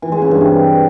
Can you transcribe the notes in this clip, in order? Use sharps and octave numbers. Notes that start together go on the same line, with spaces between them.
E3
G#3
C#3
G2
C3